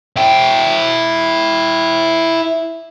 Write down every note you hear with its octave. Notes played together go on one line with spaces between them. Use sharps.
E4 G5